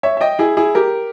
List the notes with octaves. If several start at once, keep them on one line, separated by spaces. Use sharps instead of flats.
C#5 E5
E5
D#5 G5
E4 G#4
E4 G#4
G4 A#4